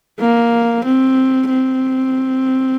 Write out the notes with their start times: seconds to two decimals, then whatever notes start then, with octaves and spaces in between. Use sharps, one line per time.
0.20 A#3
0.85 C4
1.50 C4